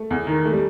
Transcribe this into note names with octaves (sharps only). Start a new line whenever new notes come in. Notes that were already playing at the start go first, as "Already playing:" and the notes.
Already playing: A3
E2
D#3
A3
G3